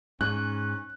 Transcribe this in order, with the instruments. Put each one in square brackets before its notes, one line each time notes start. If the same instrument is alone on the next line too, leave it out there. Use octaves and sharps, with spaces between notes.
[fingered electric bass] G#2 [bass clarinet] C#4 [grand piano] F#6